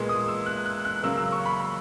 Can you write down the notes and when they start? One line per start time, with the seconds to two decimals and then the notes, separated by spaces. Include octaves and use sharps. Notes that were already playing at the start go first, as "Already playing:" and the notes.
Already playing: A#2 G#3 B3
0.09 D#6
0.28 E6
0.46 F#6
0.66 F#6
0.85 F#6
1.03 C#3 F#3 A#3 E6
1.17 E6
1.32 C#6
1.46 B5
1.60 B5